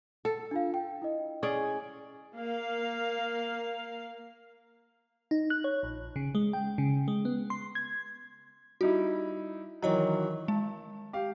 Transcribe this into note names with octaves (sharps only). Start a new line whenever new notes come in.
A4
D4 F4 F5
G5
E4 D#5
C#4 G#4 D5
A#3 F5
D#4
F#6
C#5
A#1
C#3
G#3
G5
C#3
G#3
B3
C6
G#6
G3 D#4 E4 F#4
D#3 E3 F#3 C#5 D#5 A#5
G#3 A5
G4 F5